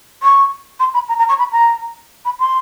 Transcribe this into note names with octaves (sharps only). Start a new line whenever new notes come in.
C#6
C6
B5
A#5
A#5
C#6
B5
A#5
B5
C6